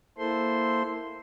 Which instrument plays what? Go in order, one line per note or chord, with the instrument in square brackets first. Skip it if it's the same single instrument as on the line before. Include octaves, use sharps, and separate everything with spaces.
[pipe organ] A#3 E4 A4 C5 C6